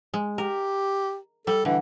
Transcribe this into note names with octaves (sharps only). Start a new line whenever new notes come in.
G#3
G4 A#4
G3 A4
D3 E3